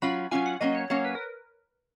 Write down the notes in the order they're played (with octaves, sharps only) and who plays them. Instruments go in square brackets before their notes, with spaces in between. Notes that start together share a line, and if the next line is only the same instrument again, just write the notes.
[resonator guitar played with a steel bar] F#3 C#4 F4 [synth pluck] B5
[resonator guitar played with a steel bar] F#3 C#4 F4 [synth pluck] G#5
[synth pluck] F#5
[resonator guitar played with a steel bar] F#3 A#3 C#4 [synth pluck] D#5
[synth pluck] C#5
[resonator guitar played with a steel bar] F#3 A#3 C#4 [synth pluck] C#5
[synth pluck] B4
A#4